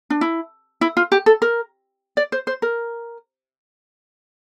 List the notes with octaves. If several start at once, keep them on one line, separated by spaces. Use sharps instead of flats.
D4
E4
E4
F4
G4
A4
A#4
D5
C5
C5
A#4